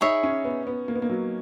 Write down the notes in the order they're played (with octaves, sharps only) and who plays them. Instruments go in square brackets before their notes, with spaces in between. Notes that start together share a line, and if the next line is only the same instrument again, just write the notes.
[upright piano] D#4 [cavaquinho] G#4 C#5 E5 B5
[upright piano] C#4
B3
B3
A#3
B3
A#3
F#3